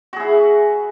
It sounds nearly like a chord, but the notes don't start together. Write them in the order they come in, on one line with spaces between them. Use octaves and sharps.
F#4 G#4 E4